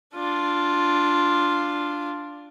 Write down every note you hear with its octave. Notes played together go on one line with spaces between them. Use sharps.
D4 F4